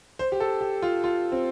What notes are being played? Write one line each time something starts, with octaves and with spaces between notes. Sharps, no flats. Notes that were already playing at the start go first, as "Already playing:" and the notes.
C5
G4
A4
G4
F4
F4
C4